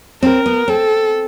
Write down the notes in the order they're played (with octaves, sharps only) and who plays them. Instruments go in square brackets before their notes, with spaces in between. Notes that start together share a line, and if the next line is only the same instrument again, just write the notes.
[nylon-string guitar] C4 [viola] A#4
[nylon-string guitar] B3
[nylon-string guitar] C4 [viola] A4